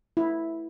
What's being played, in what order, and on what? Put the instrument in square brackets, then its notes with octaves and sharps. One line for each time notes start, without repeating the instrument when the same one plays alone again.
[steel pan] E4